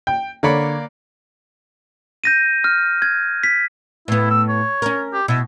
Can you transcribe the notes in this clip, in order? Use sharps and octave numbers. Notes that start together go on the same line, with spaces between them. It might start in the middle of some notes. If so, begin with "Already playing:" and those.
G5
D3 A#3 C#5 D5 B5 C#7
G6 A#6 D#7
F6
G#6
B6
A2 B3 E4
E6
C#5
C#4 A#4
G4
B2 E4